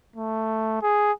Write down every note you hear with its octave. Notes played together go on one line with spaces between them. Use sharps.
A3
G#4